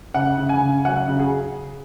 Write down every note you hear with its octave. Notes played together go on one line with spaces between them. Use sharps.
C#3 F#5
C#3
G#5
C#3
F#3 F#5
C#3
G#4